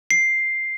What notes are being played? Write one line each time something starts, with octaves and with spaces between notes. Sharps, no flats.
C7